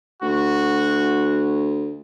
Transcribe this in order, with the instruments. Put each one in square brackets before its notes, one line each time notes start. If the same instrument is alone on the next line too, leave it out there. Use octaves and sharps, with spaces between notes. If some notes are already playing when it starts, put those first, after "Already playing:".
[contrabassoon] D2 [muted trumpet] F#4